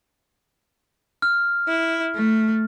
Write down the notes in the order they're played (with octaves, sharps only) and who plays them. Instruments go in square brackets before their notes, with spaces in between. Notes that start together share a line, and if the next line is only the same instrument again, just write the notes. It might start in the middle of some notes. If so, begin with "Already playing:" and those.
[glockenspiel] F6
[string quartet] E4
A3